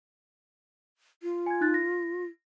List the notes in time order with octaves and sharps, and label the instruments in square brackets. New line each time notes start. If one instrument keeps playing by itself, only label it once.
[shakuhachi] F4
[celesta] G#5 G#6
D#4 F#6 A6
A#6